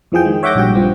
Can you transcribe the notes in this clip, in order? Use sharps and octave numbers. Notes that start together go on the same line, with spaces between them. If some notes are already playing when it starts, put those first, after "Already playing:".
F2 E3 F3 G#4 G5
D#3 G#3
C#5 E5 F#5 D6 G6 A#6
A#1 G2 F#4 G5
G2 F3 C4